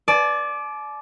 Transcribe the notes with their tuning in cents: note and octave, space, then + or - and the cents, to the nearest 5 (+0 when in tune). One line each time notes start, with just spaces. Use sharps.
D5 +0 A5 -45